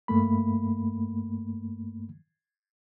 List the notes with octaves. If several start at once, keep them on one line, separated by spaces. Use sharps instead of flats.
G2 A3 A#3 B5